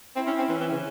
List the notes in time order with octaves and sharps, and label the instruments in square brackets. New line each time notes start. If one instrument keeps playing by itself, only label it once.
[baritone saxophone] C4 [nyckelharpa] E4
[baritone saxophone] C#4
C4
[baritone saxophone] E3 [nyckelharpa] C#4
[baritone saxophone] E3
C#3